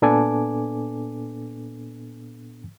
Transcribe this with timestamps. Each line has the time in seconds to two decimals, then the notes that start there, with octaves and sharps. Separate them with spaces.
0.02 A#2 B3 D4 A4 G#5 D6